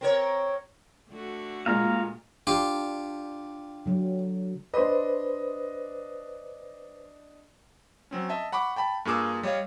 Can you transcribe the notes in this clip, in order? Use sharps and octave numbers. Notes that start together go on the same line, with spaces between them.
C4 A#4 C#5
D3 A3 F#4
A#2 G#3 F5 A#5
D4 F4 G4
D3 F#3
D4 B4 C5 D#5
F#3 C4 C#4
D#5 E5 A5
F#5 B5 C#6 D6
G5 A5 B5
G2 A#3 F4 G#4 D6 E6
G3 C#5 D#5 F5